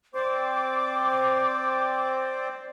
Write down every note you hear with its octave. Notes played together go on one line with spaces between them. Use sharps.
C4 C5 D5 D6